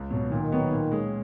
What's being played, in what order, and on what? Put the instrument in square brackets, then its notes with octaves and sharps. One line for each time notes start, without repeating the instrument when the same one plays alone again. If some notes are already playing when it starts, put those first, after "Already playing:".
Already playing: [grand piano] C#2
B2 F#3
[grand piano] A#2 [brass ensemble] D#3
[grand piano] F#3 B3 F#4
A#2
G#3 C#4 G#4